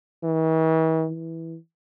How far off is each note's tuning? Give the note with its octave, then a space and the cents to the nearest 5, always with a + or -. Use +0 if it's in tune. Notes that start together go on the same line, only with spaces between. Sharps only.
E3 -45
E3 -10